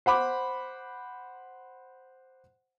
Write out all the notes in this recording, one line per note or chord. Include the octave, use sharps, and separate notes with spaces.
C5 F#5 B5 D6